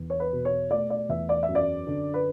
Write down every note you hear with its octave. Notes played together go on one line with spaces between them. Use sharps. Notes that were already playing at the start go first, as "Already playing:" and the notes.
Already playing: E2
C#5
B4
B2
C#5
A3 D5
D5
E2 E5
D5
E5
F#2
D5
D3
B4